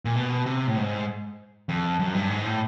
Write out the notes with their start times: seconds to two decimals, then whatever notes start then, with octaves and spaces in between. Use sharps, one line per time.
0.05 A#2
0.15 B2
0.46 C3
0.67 A2
0.77 G#2
1.69 F2
1.99 F#2
2.14 G2
2.30 G#2
2.45 A2